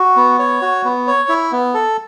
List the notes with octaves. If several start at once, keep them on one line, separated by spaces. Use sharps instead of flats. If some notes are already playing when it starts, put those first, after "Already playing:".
Already playing: F#4
B3
C#5
F#4
B3
C#5
E4
B3
A4